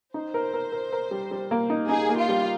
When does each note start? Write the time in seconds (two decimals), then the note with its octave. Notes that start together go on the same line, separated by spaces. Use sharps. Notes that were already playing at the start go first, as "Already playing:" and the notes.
0.14 D#4 C5
0.34 A#4
0.54 A#4
0.72 A#4
0.92 A#4
1.11 G3
1.31 G3
1.51 A#3
1.70 D#4
1.89 D#4 G#4
2.09 A#3
2.18 F4
2.29 G3